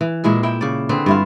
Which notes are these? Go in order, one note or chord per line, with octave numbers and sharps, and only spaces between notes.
E3
A#2 G#3 E4 G#4
E4 G5
C#3 D5
D3 C4 G#4 B4
G2 E4 F4